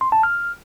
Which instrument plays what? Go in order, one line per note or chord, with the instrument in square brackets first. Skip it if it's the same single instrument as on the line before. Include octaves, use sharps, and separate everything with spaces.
[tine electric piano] C6
A5
F6